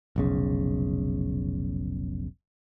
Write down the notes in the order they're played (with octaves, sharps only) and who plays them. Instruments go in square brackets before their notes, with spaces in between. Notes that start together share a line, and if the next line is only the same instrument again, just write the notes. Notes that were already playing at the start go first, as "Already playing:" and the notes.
[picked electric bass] F1 B1 C#3